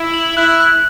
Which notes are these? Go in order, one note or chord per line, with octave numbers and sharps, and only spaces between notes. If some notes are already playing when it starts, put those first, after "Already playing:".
Already playing: E4
F#7
E4 F#6
F#6